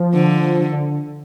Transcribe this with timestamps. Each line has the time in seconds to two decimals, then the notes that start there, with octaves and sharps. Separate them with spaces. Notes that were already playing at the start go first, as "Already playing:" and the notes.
Already playing: F3
0.14 D3
0.71 D3